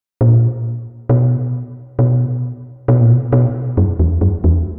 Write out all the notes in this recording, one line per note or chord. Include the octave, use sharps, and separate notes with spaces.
A#2
B2
B2
B2
A#2
B2
B2
F#2
E2
F#2
E2